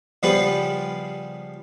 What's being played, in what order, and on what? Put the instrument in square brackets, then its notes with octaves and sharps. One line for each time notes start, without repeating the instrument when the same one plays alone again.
[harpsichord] C#3 F3 G3 B3 F4 B4